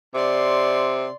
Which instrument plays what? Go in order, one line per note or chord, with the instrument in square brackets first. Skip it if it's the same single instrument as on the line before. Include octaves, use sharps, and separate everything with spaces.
[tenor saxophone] C3 [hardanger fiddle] D5 C6